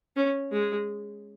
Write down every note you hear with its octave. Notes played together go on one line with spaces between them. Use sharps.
C#4
G#3